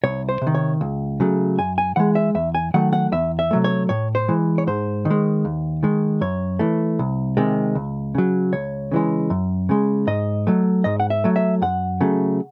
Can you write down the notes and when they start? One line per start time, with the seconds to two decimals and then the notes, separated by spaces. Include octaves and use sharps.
0.03 C2 C#5
0.29 C5
0.41 C3
0.47 D#3
0.55 C#5
0.81 C#2
1.20 C#3 F#3 A3
1.58 F#2 G#5
1.78 G#5
1.96 E3 G#3 F#5
2.15 E5
2.35 E2 E5
2.55 G#5
2.74 D#3 F#3 A3 F#5
2.93 F#5
3.12 E2 E5
3.39 E5
3.51 C3 F#3 A3
3.64 C#5
3.89 A2 C#5
4.15 C5
4.28 E3 G#3
4.58 C#5
4.67 G#2 C5
5.05 D#3
5.10 G#3
5.45 D#2
5.83 D#3 G#3
6.21 F#2 C#5
6.59 E3 A3
6.99 C2
7.37 C3 D#3 G#3
7.75 C#2
8.15 C#3 F#3
8.53 C#2 C#5
8.91 C#3 E3 G#3
9.30 F#2
9.69 C#3 G#3
10.07 G#2 D#5
10.47 F#3 A3
10.84 G#2 D#5
11.00 F#5
11.10 E5
11.24 F#3 A3
11.36 E5
11.62 F#2 F#5
12.01 C#3 F#3 A3